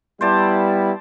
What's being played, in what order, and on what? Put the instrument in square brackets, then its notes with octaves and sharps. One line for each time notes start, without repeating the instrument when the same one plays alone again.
[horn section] G3 B3 E4 [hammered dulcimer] C5 D5 A5